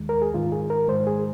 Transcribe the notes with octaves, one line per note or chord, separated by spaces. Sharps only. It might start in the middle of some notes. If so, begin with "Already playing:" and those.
Already playing: D#2 D#3 G#3
A#4
G#4
G#2 D#3 G#3 F4
G#4
A#4
G#2 D#3 G#3 C5
G#4